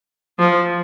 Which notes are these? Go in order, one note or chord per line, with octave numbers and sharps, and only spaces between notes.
F3